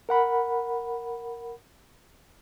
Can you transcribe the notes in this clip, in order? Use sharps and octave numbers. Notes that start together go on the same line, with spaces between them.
A#4 F#5 B5